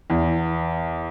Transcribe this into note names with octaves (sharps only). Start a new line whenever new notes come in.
E2